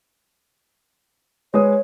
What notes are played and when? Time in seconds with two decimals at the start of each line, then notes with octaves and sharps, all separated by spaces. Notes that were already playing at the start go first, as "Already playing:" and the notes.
1.54 G#3 B4 C#5 D#6